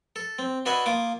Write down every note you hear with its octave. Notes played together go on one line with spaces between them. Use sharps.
A4
C4
D4 F#4 B4 D#5 E5 G#5
A#3 F4 D6 D#6